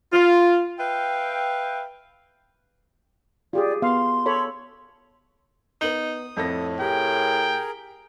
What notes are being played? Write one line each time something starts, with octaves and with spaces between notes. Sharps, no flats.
F4
B4 E5 F5 G5
F4 G4 G#4 D5
B3 F5 C6
A4 C#5 B5
B3 D#4 D#6 F#7 G7
F2 A2 A4 A#6
G4 G#4 A#4 G5